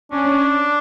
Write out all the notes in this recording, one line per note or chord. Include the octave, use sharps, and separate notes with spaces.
C#4 D4